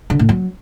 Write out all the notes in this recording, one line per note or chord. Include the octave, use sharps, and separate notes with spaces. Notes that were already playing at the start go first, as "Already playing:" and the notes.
D3
A2
F#3